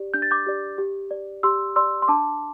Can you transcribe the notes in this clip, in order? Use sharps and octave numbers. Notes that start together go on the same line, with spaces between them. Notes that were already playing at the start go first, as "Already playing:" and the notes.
Already playing: G4 D5
D4 G6
A6
D6 G6
G4 D5
G4
D5
G4 C6 E6
D5 C6 E6
C6
D4 A5 D6